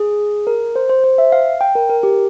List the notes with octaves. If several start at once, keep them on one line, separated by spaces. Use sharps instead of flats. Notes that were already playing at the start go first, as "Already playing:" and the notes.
Already playing: G#4
A#4
C5
C5
C5
E5
F5
G5
A#4
A#4
G4